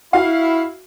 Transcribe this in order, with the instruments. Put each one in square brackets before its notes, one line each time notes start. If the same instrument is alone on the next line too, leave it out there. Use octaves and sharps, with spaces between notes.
[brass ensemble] E4 [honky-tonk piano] F#4 F5